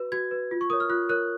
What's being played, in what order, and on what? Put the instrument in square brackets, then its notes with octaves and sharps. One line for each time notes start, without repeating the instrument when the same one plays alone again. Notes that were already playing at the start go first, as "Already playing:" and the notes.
Already playing: [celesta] F#4 B4
F#4 G#6
B4
F4
C#6
A#4 C#5 D#6
F6
F4 F#6
A#4 C#5 F#6